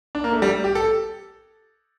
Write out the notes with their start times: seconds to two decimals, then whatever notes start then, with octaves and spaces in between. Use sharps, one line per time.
0.15 D4
0.24 A#3
0.33 A3
0.42 G3
0.64 G4
0.75 A4